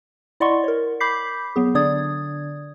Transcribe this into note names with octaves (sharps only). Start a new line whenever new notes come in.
E4 D5 D#5 F#5 C6 C#6
A#4 C#5
B5 D6 G6 B6 C7
F#3 B3 G#4
D3 D4 D5 D#6 G#6